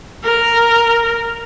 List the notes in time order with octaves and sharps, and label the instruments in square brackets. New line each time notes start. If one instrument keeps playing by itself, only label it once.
[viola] A#4